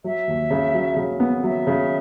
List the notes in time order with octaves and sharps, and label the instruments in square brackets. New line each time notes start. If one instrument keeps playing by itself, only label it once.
[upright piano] F#3 [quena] E5
[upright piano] D#2
C#3
F#3
C#3
B3
[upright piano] F#3 [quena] E5
[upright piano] C#3